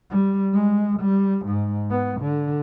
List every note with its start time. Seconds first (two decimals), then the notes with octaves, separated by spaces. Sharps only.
0.10 G3
0.53 G#3
0.99 G3
1.46 G#2
1.91 B3
2.20 D3